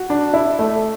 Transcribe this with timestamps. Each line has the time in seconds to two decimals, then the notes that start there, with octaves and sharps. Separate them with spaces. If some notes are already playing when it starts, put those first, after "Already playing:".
Already playing: F#4
0.10 D4
0.34 E4
0.59 A3